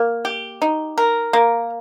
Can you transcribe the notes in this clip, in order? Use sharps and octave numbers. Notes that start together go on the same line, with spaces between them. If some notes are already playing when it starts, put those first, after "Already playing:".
Already playing: A#3
G4
D#4
A#4
A#3